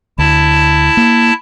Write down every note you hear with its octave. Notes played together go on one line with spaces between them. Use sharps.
D2 E4 A5
A#3